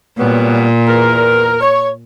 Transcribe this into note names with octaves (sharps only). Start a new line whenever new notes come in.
A#2 F#3 G3 B3
E2 A#4
C#5